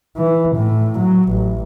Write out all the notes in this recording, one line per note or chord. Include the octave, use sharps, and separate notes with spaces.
E3
A2
F#3
A1